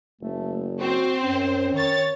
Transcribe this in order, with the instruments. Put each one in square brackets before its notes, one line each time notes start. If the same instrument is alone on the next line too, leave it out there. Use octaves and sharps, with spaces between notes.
[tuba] F#1 [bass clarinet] A3
[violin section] C4 C5 [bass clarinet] F#4
[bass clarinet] F#2 [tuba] C#4
[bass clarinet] D#3 [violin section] C#5 A6